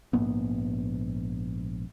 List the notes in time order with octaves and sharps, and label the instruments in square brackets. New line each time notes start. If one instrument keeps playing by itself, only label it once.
[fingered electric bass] A#1 G#2 A#3 B3